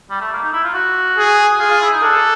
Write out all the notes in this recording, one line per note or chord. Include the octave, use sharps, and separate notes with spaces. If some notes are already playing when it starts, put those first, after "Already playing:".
G3
A3
A#3
D#4
E4
F4
F#4
G#4
F4 G#4
F4
E4
D#4
D4 A4